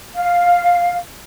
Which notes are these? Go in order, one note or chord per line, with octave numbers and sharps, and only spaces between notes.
F5